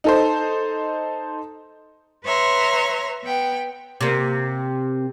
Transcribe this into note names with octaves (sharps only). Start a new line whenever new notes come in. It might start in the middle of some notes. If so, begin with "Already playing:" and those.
D#4 A4 C5
B4 C#5 E5 A#5 C6
B3 G5
C3 A#3